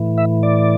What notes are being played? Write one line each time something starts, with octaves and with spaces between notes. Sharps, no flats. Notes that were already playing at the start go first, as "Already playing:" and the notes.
Already playing: A2 E3
E5
D5